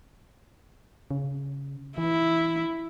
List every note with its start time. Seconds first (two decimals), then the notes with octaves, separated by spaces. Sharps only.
1.11 C#3
1.98 E3 E4